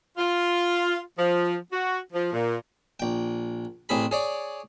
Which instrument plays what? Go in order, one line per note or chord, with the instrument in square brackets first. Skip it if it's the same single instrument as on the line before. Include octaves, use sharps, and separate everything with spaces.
[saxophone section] F4
F3
F#4
F3
A#2
[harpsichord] A#1 G5
A1 C4 G#4 B5
G#4 C#5 D5